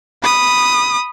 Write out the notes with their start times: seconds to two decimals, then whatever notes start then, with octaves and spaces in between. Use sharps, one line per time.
0.23 B5 D#6